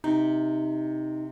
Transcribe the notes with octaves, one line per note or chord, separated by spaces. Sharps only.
C3 D#4